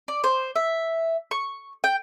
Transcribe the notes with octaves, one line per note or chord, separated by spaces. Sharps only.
D5
C5
E5
C#6
G5